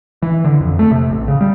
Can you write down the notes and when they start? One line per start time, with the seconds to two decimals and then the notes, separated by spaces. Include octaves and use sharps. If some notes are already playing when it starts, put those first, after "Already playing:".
0.22 E3
0.44 D3
0.60 F2
0.79 A3
0.91 C3
1.10 A1
1.28 C#3
1.41 G3